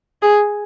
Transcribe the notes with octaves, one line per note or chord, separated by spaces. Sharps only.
G#4